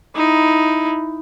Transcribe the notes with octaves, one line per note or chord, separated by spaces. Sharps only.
D#4 E4